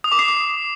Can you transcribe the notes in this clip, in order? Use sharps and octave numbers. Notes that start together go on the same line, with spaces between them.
D#6
D6
C7